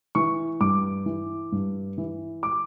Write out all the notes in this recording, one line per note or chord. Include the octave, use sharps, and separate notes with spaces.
E3 C#6
G2 D6
E3
G2
E3
D6